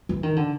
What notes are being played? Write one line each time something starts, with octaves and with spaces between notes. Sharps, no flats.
E3
D#3
D3